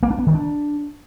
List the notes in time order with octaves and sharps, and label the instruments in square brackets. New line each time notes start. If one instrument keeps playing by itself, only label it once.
[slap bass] A#3
D4
B3
D#3
D4